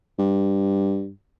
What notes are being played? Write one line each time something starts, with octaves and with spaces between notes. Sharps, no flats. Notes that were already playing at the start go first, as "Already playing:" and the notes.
G2